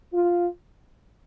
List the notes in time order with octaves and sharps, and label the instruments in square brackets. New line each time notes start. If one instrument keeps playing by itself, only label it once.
[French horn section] F4